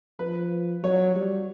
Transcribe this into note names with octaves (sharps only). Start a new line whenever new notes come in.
F3 B4
F#3 C#5
G3